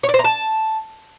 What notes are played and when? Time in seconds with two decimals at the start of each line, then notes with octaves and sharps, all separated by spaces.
0.03 C#5
0.09 D5
0.14 C5
0.19 A#5
0.24 A5